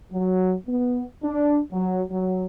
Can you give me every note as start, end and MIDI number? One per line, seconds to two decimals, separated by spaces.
0.12 0.54 54
0.67 1.03 59
1.23 1.59 62
1.72 2.01 54
2.09 2.46 54